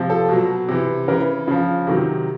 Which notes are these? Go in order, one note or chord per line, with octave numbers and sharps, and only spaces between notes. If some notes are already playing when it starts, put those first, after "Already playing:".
Already playing: C3 F3
A4
B2 F#3
C3 E3
C#3 E3 A#4
C#3 F3
C3 D#3 F#3